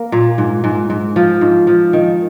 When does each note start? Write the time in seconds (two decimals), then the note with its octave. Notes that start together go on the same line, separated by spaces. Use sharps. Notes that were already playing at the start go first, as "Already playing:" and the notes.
Already playing: A#3
0.12 A#2
0.38 G#2
0.64 G#2
0.90 G#2
1.16 F3
1.41 G#2
1.67 F3
1.93 D#3